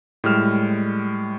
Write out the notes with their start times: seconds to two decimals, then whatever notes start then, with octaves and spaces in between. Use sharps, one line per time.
0.24 A2 G3 G#3 F6 E7